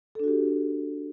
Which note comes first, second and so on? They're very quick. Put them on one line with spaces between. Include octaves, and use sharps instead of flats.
A4 D4 F#4 G4